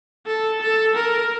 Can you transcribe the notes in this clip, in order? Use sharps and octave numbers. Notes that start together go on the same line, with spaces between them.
A4
A4
A#4